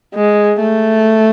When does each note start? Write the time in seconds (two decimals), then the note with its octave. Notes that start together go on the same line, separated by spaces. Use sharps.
0.14 G#3
0.60 A3